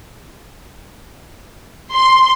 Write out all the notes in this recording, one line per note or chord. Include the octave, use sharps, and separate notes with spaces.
C6